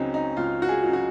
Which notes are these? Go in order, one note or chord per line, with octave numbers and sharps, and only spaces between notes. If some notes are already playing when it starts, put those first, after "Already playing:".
Already playing: C#2 C#3 F#3 C4 C#4 D#4
D#4
C#2 F4
F#4
G#4
C#3 F#3
F#4